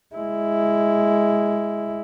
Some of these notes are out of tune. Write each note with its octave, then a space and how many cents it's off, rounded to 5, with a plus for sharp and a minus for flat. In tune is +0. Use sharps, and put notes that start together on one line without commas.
G#3 +0 E4 +0